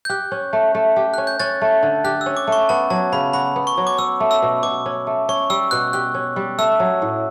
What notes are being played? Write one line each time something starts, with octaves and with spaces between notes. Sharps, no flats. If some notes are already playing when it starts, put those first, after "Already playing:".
G6
G4 F#6
C#4
A3
A3
G4
C#4 F#6
G6
C#4 F#6 A6
A3
D3
G4 F#6
C#4 E6
D6
A3
C#6
B3 A5
F#3 A5
C#3 B5
F#4 B5
B3
C#6
F#3
D6
C#4 E6
A3
E6
B2
B2 D6
C#4
A3
C#4 C#6
G3 E6
B2 F#6
G4 F#6
C#4
G3
A3 E6
F#3
A2